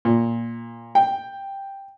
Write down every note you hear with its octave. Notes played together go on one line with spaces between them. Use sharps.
A#2
G5